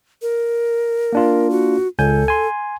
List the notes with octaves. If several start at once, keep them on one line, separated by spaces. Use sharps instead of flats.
A#4
A#3 D4 F4
F#4
C#2 A4 G#5 G6
G#5 C6